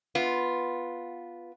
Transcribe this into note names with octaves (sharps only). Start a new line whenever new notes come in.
B3 F4